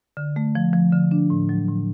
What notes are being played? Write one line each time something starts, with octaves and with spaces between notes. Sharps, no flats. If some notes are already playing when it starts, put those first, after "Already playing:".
D3
A3
F3
F3
D3
D4
A2
F#3
A2